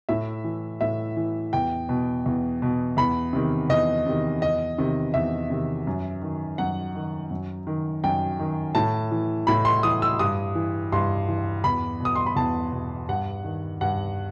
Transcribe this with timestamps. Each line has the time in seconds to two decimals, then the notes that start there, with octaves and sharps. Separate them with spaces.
0.09 A2 E5
0.44 E3
0.81 A2 E5
1.17 E3
1.53 E2 G5
1.89 B2
2.26 E2
2.62 B2
2.97 E2 B5
3.33 C3 D#3
3.69 E2 D#5
4.06 C3 D#3
4.42 E2 D#5
4.78 C3 D#3
5.14 E2 E5
5.50 C3 D#3
5.87 F#2
6.22 D#3
6.58 F#2 F#5
6.95 D#3
7.31 F#2
7.67 D#3
8.04 F#2 G5
8.39 D#3
8.75 A2 A5
9.11 E3
9.47 A2 B5
9.65 C6
9.83 E3 D#6
10.02 E6
10.19 G2 D#6
10.55 E3
10.92 G2 C6
11.28 E3
11.64 E2 B5
12.00 B2
12.05 D#6
12.15 C6
12.26 B5
12.36 E2 A5
12.72 B2
13.09 G2 F#5
13.44 D#3
13.81 G2 F#5